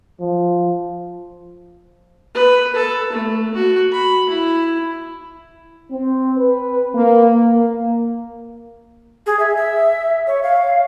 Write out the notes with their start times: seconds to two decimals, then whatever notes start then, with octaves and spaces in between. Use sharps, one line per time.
0.20 F3
2.34 B4
2.75 A4
3.13 A3
3.54 F#4
3.92 B5
4.29 E4
5.91 C4
6.38 B4
6.95 A#3
7.51 A#3
9.26 G#4
9.39 E5
9.57 E5
10.27 C#5
10.43 F5